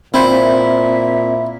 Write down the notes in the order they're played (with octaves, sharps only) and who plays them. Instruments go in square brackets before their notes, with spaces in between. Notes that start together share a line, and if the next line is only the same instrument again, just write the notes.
[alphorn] A#2 [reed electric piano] C4 C5 [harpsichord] E4 [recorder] E5